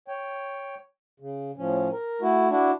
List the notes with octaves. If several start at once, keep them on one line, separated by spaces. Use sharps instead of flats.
C#5 G5
C#3
A2 F3 C#4
A#4
A3 E4 F#4
D4 E4 F#4